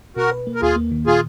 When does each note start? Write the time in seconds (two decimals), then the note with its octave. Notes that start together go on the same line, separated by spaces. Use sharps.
0.16 B2 F#4 A#4
0.31 B4
0.47 A#3
0.55 A#4
0.62 D#2 F4 G#4
0.76 A#3
0.91 D#3
1.07 A#2 F4 G#4